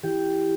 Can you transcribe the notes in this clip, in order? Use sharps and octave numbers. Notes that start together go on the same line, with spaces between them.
E3 G4